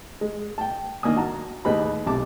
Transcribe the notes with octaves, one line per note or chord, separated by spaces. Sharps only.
G#3
G5 A5
D#3 A#3 D4 G#5 D#6
F#4 A5 A#5
D#2 A2 G#4 B4 D#5 B5
B1 C3 A5 D6